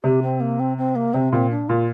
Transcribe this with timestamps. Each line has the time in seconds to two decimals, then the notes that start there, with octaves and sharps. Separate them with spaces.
0.04 C3 G4
0.23 C4
0.41 A#3
0.60 C4
0.78 C4
0.96 A#3
1.14 C3 C4
1.33 A#2 C4
1.51 D4
1.69 A#2 F4